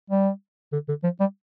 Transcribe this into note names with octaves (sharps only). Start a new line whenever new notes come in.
G3
D3
D3
F3
G3